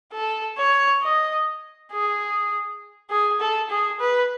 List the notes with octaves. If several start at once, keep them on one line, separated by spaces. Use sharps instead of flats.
A4
C#5
D#5
G#4
G#4
A4
G#4
B4